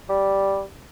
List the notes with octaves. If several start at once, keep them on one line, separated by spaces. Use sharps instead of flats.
G3